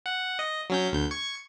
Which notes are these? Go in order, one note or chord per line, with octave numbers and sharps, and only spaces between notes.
F#5
D#5
F#3 C#4 G6
D2 G6
C#6 G#6